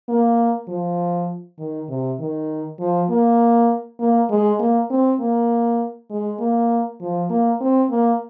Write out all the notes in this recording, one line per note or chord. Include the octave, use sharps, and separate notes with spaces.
A#3
F3
D#3
C3
D#3
F3
A#3
A#3
G#3
A#3
C4
A#3
G#3
A#3
F3
A#3
C4
A#3